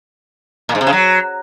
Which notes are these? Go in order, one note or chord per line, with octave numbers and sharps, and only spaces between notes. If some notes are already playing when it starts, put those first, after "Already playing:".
A#2
G#2
C3
C#3
F#3